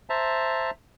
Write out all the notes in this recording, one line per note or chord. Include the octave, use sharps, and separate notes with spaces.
C5 E5 A5 A#5